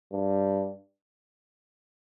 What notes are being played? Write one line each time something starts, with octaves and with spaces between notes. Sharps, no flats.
G2